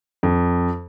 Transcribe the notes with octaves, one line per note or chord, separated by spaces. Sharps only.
F2